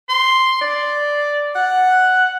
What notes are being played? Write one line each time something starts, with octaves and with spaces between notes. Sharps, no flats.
C6
D5
F#5